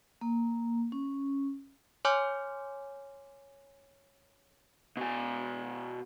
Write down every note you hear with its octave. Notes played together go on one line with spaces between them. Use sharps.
A#3
C#4
C#5 G#5 C6 D6 F6 G6
B2 G#5